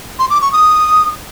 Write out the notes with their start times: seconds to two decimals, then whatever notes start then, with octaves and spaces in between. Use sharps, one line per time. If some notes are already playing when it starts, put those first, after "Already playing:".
0.19 C6
0.30 D6
0.41 C#6
0.53 D#6